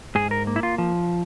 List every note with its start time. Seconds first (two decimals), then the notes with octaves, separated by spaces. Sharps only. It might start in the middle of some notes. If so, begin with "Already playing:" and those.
0.15 G#2 G#4
0.31 A#4
0.47 A#3
0.56 E4
0.63 F4
0.78 F3